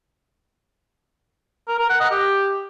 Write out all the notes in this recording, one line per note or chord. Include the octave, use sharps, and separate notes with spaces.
A#4
A#4
F#5
D#5
G4